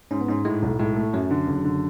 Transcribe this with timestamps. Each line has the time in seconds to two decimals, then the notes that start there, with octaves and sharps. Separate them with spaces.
0.11 G#2 C#4
0.21 B3
0.28 G#2 C#4
0.45 A2 G#3
0.62 B1
0.79 A2 G#3
0.96 A3
1.13 F#2 F#3
1.31 D3
1.47 F#1
1.64 D3